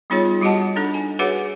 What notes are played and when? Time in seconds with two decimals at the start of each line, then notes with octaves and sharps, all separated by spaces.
0.10 G3 B3 D#4 F4 G#4 C#5
0.42 G3 F#4 G4 D#5 F#5 A5
0.76 D4 D#4 A4
0.94 G#5
1.19 F#4 G#4 B4 C#5 E5 F#5